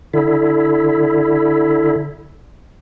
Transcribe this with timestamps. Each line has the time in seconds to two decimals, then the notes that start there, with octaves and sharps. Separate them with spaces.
0.13 D3 E4